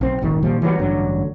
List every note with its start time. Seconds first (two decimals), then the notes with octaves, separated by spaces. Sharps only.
0.01 B1 C4
0.22 D#1 G#1 D#3
0.43 A#2 D#3 F3 G3
0.62 E3 F#3 G3 B3
0.79 A1 G2 D3 F#3